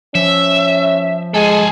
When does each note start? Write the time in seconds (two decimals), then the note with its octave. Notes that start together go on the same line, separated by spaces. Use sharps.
0.15 F3 C#4 E5
1.34 G#3 G#4 A4